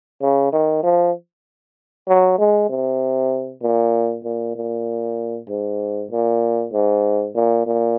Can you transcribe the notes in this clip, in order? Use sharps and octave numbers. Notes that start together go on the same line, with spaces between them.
C#3
D#3
F3
F#3
G#3
C3
A#2
A#2
A#2
G#2
A#2
G#2
A#2
A#2